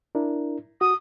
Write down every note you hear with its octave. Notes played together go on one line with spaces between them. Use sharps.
D4 E4 A#4
F#4 D#6